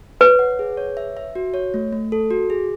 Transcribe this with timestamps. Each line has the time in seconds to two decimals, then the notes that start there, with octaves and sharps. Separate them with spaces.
0.20 B4 C#5
0.39 F#5
0.59 G#4
0.77 C#5
0.97 E5
1.17 E5
1.35 F#4
1.54 C#5
1.74 A3
1.93 A3
2.12 A4
2.31 F#4
2.50 G#4